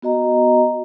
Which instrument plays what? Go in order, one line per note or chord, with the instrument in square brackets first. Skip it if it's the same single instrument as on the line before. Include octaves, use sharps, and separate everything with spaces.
[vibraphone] B3 F#4 D#5 A#5